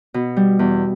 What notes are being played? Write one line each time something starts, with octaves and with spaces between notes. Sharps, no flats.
B2
G3
E2